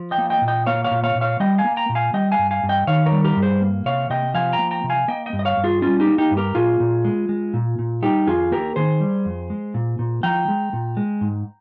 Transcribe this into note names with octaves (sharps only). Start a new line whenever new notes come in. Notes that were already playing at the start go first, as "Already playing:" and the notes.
Already playing: F3
D#5 G5
A#3
D#5 G5
A#2
D#5 G5
A#3 C#5 F5
C#5 F5
A#2
C#5 F5
A#2
C#5 F5
G3 D#5 G5
F5 G#5
A#3
G5 A#5
A#2
F5 G#5
G3 D#5 G5
F5 G#5
G2
F5 G#5
G2
D#5 G5
D#3 C#5 F5
A#4 C#5
G3
G4 A#4
G2
G#4 C5
A#3
C3 C#5 F5
C3 D#5 G5
F3 F5 G#5
G5 A#5
A#3
G5 A#5
C3
F5 G#5
A#3 D#5 G5
D#5 G5
G2
D#5
C#5 F5
G2
F4 G#4
G3 C#4 F4
D#4 G4
A#3
D#4 G4
G2
G4 A#4
A#2 F4 G#4
A#2
G#3
G#3
A#2
A#2
G3 D#4 G4
F2 F4 G#4
A#3 G4 A#4
D#3 G#4 C5
G3
F2
G#3
A#2
A#2
F3 G5 A#5
G#3
A#2
G#3
G#2